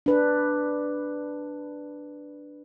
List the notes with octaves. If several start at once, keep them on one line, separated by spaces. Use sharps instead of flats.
D4 B4